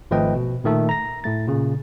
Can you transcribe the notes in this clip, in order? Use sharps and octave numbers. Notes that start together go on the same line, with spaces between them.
G#1 F3 A3 B4 D#5 G5
B2
A#2 D#3 A3 A4
A#5 A#6
A2 A3 A6
A#2 C#3